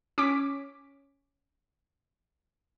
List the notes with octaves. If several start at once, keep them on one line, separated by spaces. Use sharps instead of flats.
C#4 D6 B6